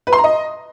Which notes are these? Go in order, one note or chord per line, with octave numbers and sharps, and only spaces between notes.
B4
C6
A#5
D#5